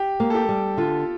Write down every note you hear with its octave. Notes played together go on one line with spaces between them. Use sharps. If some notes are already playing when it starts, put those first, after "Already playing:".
Already playing: G4
A#3
A4
G4
G3
D3 F4